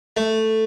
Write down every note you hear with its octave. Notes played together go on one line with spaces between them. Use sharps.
A3